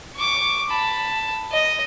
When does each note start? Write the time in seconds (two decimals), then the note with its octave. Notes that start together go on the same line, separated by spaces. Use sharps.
0.16 C#6 D6
0.70 A5 B5
1.51 D#5